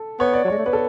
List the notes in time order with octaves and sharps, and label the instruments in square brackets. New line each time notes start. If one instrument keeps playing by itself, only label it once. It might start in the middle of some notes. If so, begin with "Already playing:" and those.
Already playing: [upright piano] A4
[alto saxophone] B3 [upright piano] C#5
[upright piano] D5
[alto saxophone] F#3
[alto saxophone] G#3 [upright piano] C#5
[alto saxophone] A3
[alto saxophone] B3 [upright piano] B4
[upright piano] A4